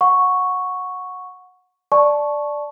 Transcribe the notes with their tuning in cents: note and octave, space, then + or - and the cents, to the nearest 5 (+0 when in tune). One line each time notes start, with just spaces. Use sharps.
F#5 -20 C#6 +0
D5 +0 A5 -20 C#6 -5